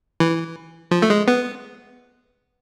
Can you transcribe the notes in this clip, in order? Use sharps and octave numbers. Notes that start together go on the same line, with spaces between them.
E3
F3
A3
G#3
B3